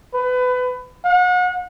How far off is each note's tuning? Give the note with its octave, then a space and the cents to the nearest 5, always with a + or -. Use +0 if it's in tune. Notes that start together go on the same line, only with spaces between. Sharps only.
B4 +25
F#5 -35